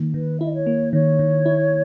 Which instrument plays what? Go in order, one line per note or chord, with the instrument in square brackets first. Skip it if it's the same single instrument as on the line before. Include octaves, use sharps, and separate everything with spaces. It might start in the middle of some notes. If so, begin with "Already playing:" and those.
Already playing: [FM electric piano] D#3 A#3
[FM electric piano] D#3 [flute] B4
[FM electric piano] E4 [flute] E5
[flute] D#5
C#5
[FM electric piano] A#3
[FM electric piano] D#3 [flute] C#5
[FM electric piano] D#3
E4